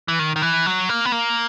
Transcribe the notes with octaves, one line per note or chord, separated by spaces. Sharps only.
E3
D#3
D#3
E3
F#3
A#3
B3
A#3